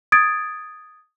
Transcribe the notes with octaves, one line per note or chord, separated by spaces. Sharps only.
D#6 G#6 A6 D7